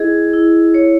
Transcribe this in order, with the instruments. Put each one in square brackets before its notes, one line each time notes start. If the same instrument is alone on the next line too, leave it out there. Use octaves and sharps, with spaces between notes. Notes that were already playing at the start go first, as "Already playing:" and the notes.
Already playing: [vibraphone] E4 G#4 D#5
E4
C#5